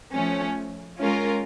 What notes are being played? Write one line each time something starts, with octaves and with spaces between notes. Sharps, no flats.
F3 A3 C#4
G#3 C#4 F4 A#4